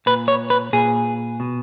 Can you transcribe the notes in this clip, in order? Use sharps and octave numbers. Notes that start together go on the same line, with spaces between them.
A#2 B4
C#5
B4
A#2 G#4
B2